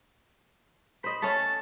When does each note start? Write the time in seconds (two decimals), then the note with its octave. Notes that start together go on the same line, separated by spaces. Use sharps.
1.04 C5 D#5 B5
1.22 A3 C#4 A5